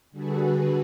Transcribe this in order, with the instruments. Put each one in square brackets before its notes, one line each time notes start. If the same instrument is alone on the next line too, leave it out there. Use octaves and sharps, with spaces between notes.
[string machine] D3 G3 F#4 G#4 A4 B4